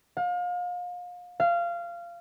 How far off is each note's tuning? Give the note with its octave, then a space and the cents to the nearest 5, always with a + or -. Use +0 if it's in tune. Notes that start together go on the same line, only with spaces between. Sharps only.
F5 +35
F5 -20